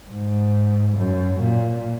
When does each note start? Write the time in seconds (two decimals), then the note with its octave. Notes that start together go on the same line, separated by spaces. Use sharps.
0.10 G#2
0.98 F#2
1.41 A#2